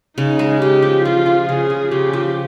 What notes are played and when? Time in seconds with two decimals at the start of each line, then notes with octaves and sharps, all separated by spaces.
0.18 C#3 D#4
0.39 G#3
0.61 G#3 G4
0.82 F3
1.04 F3 F4
1.26 F3
1.49 C#3 G#4
1.70 F3
1.91 C#3 G4
2.13 F3